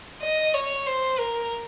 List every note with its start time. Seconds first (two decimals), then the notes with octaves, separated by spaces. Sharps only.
0.23 D#5
0.54 C#5
0.87 C5
1.18 A#4